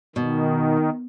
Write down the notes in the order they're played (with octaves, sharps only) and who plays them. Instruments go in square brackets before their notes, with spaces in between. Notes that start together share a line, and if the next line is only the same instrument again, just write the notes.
[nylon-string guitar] B2 [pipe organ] D#3